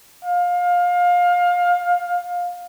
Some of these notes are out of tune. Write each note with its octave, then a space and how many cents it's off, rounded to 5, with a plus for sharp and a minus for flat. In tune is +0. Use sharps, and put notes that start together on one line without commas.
F5 +25